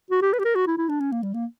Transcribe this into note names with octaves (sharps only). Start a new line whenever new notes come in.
F#4
G4
B4
G4
A#4
F#4
E4
E4
D4
C#4
A#3
G3
A#3